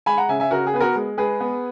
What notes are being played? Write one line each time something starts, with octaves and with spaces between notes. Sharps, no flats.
G#3 G#5 B5
F#5 A#5
C#3 E5 G#5
E5 G#5
C#3 F#4 A#4
G#4
B3 B4
F#4 A#4
G#3
G#3 G#4 B4
B3